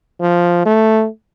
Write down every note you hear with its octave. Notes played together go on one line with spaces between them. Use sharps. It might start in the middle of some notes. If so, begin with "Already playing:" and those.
F3
A3